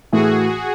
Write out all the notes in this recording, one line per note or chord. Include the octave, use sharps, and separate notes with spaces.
A2 E3 A3 F#4 G#4